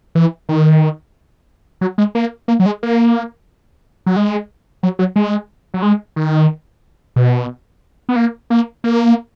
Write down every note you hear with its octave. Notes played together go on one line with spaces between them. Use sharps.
E3
D#3
F#3
G#3
A#3
A#3
F#3
G#3
A#3
F#3
G#3
F#3
F#3
G#3
F#3
G#3
D#3
B2
B3
A#3
A#3
A#3